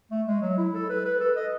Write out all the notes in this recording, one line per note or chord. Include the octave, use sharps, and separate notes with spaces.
A3
G#3
F#3
E4
A4
B4
B4
A4
D#5